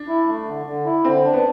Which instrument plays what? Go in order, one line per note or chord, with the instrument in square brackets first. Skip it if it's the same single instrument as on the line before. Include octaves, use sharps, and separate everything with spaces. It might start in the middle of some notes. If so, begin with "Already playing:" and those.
Already playing: [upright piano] D4
[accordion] E4
A3
D3
D3
E4
[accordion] D3 [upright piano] C4
[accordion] D4
[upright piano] B3